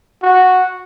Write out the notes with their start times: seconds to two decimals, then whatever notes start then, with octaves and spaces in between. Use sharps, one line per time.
0.23 F#4